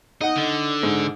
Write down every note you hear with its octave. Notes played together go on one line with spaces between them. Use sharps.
D#4 D#5 F#5
D3
G#2